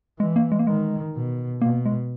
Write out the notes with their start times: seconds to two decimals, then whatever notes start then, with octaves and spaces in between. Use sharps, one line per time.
0.19 E3 G#3
0.36 A#3
0.52 G#3
0.59 A#3
0.67 D#3 G#3
1.15 B2
1.62 B2 A#3
1.86 G#3